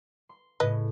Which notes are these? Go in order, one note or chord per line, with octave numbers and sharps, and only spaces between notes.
C6
A2 C#3 B4 D#5